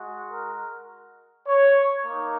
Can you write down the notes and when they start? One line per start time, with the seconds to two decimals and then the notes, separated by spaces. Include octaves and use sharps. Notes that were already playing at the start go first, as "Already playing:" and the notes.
Already playing: G#3 F#4
0.32 A#4
1.48 C#5
2.06 A#3 D#4